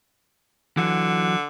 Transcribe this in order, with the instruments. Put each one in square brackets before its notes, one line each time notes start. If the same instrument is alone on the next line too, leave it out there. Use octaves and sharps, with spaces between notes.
[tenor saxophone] D3 [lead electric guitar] E3 F#3